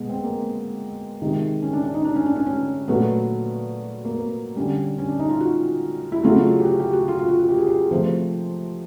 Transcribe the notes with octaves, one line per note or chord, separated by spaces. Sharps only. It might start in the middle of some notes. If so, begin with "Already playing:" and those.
Already playing: B2 G#3 B3
C4
A#3
C3 D#3 G#3
C#4
D4
D4
D#4
D4
C#4
D4
C#4
C#4
A#2 F#3 A3 B3
A#3
B3
D3 G3 C#4
C#4
D4
D#4
F4
F#4
E4
C#3 F#3 A3 F4
G4
F#4
G4
F#4
F4
F4
F#4
F#4
G4
G#4
G4
C3 F3 A3 C5